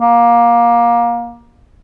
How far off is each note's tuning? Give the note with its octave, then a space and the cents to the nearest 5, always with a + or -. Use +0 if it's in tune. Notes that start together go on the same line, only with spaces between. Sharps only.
A#3 +20